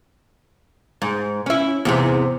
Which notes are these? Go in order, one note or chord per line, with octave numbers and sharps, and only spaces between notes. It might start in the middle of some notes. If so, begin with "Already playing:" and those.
G#2
C#4 E4
E2 G#2 C3